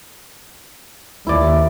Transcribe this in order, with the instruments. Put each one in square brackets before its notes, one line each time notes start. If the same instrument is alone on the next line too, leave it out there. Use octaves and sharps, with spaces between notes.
[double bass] D#2 [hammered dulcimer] E4 D5